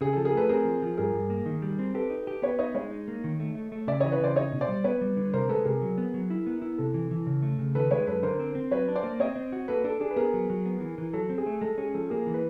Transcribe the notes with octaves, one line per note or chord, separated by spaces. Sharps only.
C#3 G#4
F3 A4
G#4 A#4
A3 A4 B4
C4 G#4 A#4
F3
F3
G2 G#4 A#4
G2
A#3
D#3
G3
C4
G4 A4 B4
D#4
G4
B3 B4 C#5
D#4 C#5 D#5
G#3 C#5 D#5
D#4
A#3
D#3
A3
A3
A3
C#3 D5 E5
E3 C#5 D#5
B4 C#5
C#3 C5 D5
D#4 C#5 D#5
B2
C5 D5
G3
B3 B4 C#5
G3
D3
C3 A#4 C5
G#3 A4 B4
C3 G#4 A#4
F#3
B3
F#3
E4
B3
E4
C3 A4
E3
E3
C#3
A3
C#3
D#3 A4 B4
G#3 B4 C#5
F#2 A4 B4
D3 A#4 C5
C4
C4
F#3 B4 C#5
D4
C5 D5
A#3
C4 C#5 D#5
C4
F#4
A#3 A4 B4
D4 A4
D4 G#4
B4
B3 G#4 A#4
F#3
F#3
B3
E3
E3
F#3 A4
C4
G#4
A3
G#3 A4
C#4 G#4
F3 A4
A#3 G#4 A#4
E3
B4